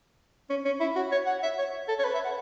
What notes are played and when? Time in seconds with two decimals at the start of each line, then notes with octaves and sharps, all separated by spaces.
0.50 C#4
0.65 C#4
0.80 E4
0.96 F#4
1.12 C#5
1.27 F#5
1.43 E5
1.59 C#5
1.89 A4
1.99 C#5
2.05 B4
2.15 E5
2.25 F#5